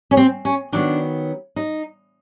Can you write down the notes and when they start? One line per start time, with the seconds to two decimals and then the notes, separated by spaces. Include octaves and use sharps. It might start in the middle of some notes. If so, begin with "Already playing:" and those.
0.11 C#4
0.17 C4
0.45 C#4
0.72 D#3 F#3 B3 D4
1.56 D#4